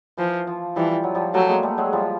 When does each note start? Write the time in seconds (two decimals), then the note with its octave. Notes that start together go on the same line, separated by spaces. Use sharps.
0.17 E3 F3
0.47 F3
0.76 E3 F3 G3
1.04 F#3
1.15 F3 G3
1.34 F#3 G3 A3
1.48 G#3 A#3
1.63 G3 A3
1.78 F#3 G#3
1.93 F3 G3